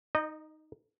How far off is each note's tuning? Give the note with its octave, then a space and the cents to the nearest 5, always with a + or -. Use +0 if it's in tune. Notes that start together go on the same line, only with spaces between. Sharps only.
D#4 +0 D#5 -30